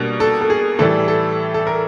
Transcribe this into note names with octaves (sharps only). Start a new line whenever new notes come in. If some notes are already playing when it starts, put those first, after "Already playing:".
Already playing: B2 G3 A#3 D4
A4
A4
G#4
A2 E3 G3 A4
A4
A4
A#4